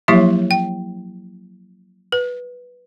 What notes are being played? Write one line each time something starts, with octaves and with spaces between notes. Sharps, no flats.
F3 F#3 A#3 E4 G4 E5
G5
B4